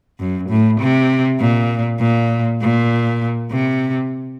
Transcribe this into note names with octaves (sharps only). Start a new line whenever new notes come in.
F#2
A2
C3
A#2
A#2
A#2
C3